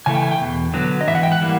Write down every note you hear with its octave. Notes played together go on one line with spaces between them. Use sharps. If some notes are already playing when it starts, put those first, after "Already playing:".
C#3 E3 A3 G#5
G5
G#5
G5
E2 B2
D3 F#3 B3
D#5
G#2 E3 E5
F#5
G5
F#5
E3 G3 A#3